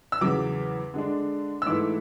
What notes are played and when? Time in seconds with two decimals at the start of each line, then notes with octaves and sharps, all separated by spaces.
0.12 E6
0.21 E2 C#3 F#3 D6
0.94 D3 G#3 D4
1.62 E6
1.66 G#2 E3 A3 E4 D6